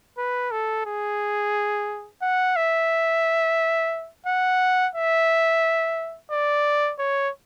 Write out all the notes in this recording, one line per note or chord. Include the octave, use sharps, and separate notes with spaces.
B4
A4
G#4
F#5
E5
F#5
E5
D5
C#5